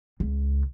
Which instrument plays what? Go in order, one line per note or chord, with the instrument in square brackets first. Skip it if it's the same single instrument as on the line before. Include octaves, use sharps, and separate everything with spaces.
[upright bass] C#2